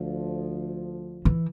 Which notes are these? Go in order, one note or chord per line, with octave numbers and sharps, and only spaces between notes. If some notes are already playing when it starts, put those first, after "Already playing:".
Already playing: D2 D3 F3
E3